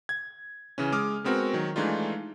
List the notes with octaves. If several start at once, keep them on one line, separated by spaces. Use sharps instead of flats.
G#6
C#3 E3 C#4
G#3 D6 D#6 F6
G#3 B3 C4 F#4 A#4
D#3 F#3
E3 G#3 A3 D4 D#4 F4